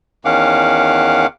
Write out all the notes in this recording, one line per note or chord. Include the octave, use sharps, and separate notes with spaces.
E2 D#3 C#4 F5 F#5 D6